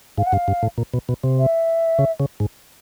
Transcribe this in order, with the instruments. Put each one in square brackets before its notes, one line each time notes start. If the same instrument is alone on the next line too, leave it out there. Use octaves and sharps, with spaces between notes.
[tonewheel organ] G#2 [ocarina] F5
[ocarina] F#5
[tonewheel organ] G2 [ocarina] F5
[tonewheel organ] G2
A2
A#2
B2
B2
C3
[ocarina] E5
[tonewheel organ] C#3
C#3
G#2